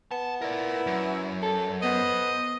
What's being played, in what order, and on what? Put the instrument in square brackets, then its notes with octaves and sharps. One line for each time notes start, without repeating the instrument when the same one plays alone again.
[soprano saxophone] B3 [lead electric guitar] A5
[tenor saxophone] E4 [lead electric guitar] A#4 D5
[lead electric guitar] F#2
[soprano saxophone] A4
[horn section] B3 [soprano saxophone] C5 [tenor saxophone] D#5